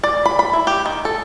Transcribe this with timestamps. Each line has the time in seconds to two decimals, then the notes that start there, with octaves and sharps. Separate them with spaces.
0.03 D5
0.26 B5
0.39 B5
0.53 E4
0.67 G4
0.86 D#3
1.05 A4